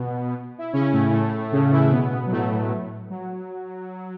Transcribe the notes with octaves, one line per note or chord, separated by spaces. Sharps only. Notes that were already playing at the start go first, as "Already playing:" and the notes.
Already playing: B2 B3
E4
C#3 C#4
A2 A3
A2 A3
C#3 C#4
E3 E4
B2 B3
F#3
A2 A3
F#3